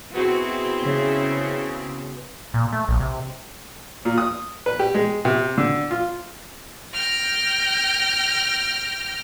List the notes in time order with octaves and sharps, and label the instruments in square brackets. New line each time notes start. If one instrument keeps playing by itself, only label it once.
[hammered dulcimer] B2 B3 [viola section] C4 E4 G#4 [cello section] F#4
[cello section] C#3
[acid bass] A#2
A3
A#1
C3
[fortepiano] A#2
D#6
B4
G4
G#3
C3
D3
F4
[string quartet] G5 F6 A#6